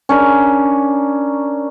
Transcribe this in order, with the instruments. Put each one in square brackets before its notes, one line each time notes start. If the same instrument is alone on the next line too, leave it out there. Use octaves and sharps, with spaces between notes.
[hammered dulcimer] C#4 D4 A#4